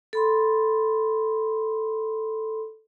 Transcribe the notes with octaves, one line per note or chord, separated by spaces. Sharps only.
A4 B5 C6